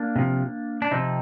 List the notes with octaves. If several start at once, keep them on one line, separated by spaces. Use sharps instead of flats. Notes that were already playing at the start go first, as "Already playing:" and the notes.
Already playing: A#3 D4
C3 F3
D4
C3 F3 C4 D#4